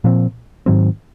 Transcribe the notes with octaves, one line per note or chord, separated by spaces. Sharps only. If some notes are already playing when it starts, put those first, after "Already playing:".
A#2 F3 C4
G#2 D#3 F#3 C4